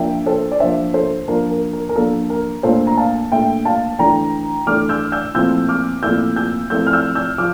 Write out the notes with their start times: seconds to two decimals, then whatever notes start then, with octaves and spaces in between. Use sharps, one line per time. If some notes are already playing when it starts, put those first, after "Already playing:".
Already playing: F3 A#3 D4 E5 G5
0.26 A4 C5
0.51 D5
0.60 F3 A#3 D4 C5 E5
0.94 A4 C5
1.28 F3 A#3 D4 A#4
1.51 A#4
1.73 A#4
1.89 A#4
1.96 F3 A#3 D4 A4
2.30 A#4
2.63 A#2 A3 D4 A4 C5
2.87 A#5
2.97 F5 A5
3.31 A#2 A3 D4 E5 G5
3.65 F5 A5
3.99 E3 A3 D4 G5 A#5
4.67 E3 A3 D4 D6 F6
4.89 E6 G6
5.12 E6 G6
5.34 A#2 F3 A3 C4 E4 E6 G6
5.69 D6 F6
6.03 A#2 F3 A3 C4 E4 E6 G6
6.36 E6 G6
6.70 F3 A3 C4 E4 E6 G6
6.87 F6
6.93 E6 G6
7.15 E6 G6
7.38 F3 D6 F6